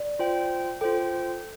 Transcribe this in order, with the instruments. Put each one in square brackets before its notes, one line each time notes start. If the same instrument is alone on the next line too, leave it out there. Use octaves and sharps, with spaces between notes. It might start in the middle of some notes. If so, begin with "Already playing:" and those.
Already playing: [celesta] D5
[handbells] F4 C5 G5
[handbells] F4 C5 G5 [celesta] A4